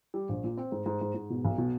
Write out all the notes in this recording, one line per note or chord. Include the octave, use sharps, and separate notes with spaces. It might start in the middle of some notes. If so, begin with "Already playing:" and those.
G3
A#1
A#2
C4
G#2
G#2
G#2
G#2
B2
B1
B2